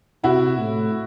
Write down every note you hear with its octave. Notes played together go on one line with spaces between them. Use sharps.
C3 E4 F#4
A2